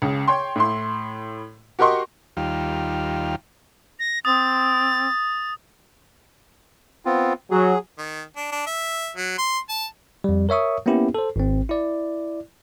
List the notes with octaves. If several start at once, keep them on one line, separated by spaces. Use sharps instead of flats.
C#2 C#3
C#5 G5 C6
A2 E4 C6
F#4 G4 A#4 D#5 C6 C#6
D#2 G3 F4
A#6
C4 D#6 A6
B3 C4 F4
F#3 G#4
D#3
D4
D4
E5
F#3
C6
A5
F2 G3
A#4 C#5 E5 C#6 D#6
A#3 B3 C#4 E4 G4
A4 C5
G#1 C4
E4 D5